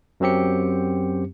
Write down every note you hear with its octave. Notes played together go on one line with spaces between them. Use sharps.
F#2 F#3 C4 G4 C#7